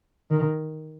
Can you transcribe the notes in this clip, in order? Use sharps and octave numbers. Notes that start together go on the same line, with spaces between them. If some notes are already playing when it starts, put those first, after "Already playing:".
D#3